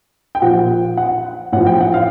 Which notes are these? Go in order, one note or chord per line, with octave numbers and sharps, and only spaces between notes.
G5
A#2 F3 F#5
F#5
A2 F3 F#5
G5
F#5
F5